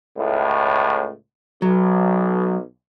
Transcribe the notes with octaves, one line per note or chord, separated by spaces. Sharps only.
C#2 A2
B1 F#3